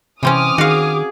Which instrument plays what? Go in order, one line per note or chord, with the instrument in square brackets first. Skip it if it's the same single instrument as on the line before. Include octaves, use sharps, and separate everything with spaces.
[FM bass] C3 [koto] E3 C4 C#4 [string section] D6 D#6 F6
[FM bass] D#3 [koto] F#4 F5 [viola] G#4